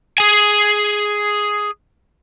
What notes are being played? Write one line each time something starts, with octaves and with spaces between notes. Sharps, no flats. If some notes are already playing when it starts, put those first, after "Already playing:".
G#4 G#5